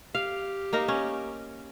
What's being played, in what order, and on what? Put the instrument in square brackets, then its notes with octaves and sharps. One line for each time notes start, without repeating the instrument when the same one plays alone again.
[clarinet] G4 [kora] F5
[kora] A#3 D#4 A#4
C#4